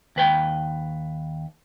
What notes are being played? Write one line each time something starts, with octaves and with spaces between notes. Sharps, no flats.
D#2 B4 G5